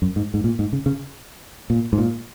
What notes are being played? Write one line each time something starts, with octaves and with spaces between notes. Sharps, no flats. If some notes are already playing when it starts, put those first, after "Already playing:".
F#2
G#2
G#2
A#2
G#2
C#3
C#3
A#2
G#2
A#2